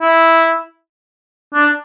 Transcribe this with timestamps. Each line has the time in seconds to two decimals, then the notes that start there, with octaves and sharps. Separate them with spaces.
0.02 E4
1.54 D4